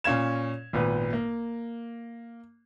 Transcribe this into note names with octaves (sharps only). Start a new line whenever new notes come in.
A#2 C#4 F5 G#6 E7
G#1 A#2 B3 B4
A#3